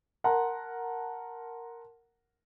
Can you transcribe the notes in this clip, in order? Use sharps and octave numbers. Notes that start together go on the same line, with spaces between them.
A#4 F#5 A5 A#5 C6